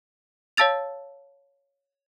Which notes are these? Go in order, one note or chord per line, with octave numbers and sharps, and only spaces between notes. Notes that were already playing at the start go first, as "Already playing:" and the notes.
C#5 F5 A5 E6 A6 F7